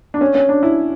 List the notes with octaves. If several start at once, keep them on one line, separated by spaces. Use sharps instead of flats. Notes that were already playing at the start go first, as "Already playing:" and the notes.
D4
C#4
C#4
D4
E4